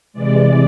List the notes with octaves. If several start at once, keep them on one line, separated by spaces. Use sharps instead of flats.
C3 E3 G#3 D5